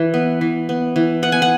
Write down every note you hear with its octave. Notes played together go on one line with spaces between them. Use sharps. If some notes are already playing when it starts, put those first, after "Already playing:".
Already playing: E3
B3
E3
B3
E3
B3 F#5
G#5
F#5